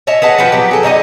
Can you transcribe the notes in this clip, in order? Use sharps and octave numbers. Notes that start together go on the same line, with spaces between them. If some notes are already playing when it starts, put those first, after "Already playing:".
C#5 D#5 E5 A5
G#4 B4 F#5 A5
F3 F#4 B4 G5
F#3 B3 G4
G#4 A4
D3 D#4 F4 D#5